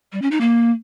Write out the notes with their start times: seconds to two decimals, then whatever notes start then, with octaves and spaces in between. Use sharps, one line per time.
0.12 G3
0.22 C#4
0.31 D#4
0.41 A#3